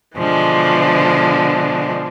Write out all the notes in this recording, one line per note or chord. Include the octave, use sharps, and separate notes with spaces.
B2 D3 E3 F3 G#3